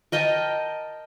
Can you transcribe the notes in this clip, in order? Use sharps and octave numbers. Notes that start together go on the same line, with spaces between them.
A#4 D#5 G5 A5